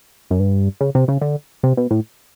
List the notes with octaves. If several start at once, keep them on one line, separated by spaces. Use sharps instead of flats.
F#2
G2
C#3
C3
C#3
D3
C3
B2
A2